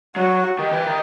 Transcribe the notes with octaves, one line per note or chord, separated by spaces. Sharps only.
F#3 F#4
D#3 G4
E3
D#3